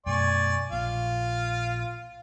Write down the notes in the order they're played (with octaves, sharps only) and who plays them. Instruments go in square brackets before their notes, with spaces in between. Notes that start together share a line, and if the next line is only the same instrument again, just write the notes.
[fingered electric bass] F#2 B2 A3 [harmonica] D5 G#5 C#6
[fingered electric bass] A#1 A#2 [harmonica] F4 F5